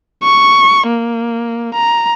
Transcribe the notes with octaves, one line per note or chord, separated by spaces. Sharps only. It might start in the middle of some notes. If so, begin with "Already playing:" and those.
C#6
A#3
A#5